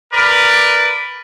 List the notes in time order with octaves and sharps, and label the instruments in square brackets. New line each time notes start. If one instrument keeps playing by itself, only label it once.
[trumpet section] A#4 B4 D5